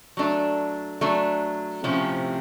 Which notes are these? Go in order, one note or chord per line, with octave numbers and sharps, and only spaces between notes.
F#3 A3 D4
F#3 A3 D4
A2 C3 F3 A3 C#4